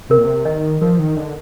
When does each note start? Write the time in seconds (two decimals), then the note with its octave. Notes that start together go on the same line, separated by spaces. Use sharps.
0.10 C3 A#4
0.18 A#2
0.25 C3
0.45 D#3 D#5
0.81 F3 A#4
0.99 D#3
1.17 D3 D#5